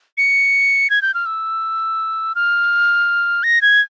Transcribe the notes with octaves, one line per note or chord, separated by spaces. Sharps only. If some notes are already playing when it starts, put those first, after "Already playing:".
C#7
G#6
G6
F6
E6
F6
A#6
G#6